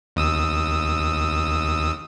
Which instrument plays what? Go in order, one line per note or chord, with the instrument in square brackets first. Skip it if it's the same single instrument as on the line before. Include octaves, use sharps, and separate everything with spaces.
[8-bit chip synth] D#2 D#6 E6